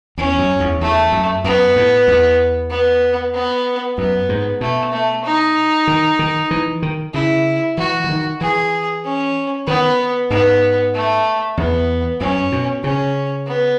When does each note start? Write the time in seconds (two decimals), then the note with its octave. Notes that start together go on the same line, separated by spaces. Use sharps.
0.18 E2 C#4
0.39 F#2
0.60 E2
0.81 E2 A3
1.12 F#2
1.44 F#2 B3
1.76 A2
2.08 E2
2.71 B3
3.34 B3
3.98 F#2 B3
4.29 G#2
4.61 B2 A3
4.93 A3
5.25 D#4
5.87 D#3
6.19 D#3
6.51 E3
6.82 D#3
7.14 C#3 E4
7.78 E3 F#4
8.04 E3
8.09 D#3
8.41 E3 G#4
9.04 C#4
9.67 D#3 B3
10.30 G#2 B3
10.94 A3
11.57 E2 B3
12.21 F#2 C#4
12.52 B2
12.84 C#3 C#4
13.47 B3